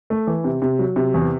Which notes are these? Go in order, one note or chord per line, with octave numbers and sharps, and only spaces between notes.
A3
E3
C3
C3
F#3
C3
E2